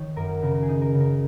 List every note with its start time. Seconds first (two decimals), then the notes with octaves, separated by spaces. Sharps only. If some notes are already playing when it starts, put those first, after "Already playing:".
Already playing: D#3 C#5
0.16 F#2 A#4
0.43 C#3 A#4
0.55 A#4
0.63 G#4
0.69 D#4
0.81 A#4
0.95 C#3
1.00 A#4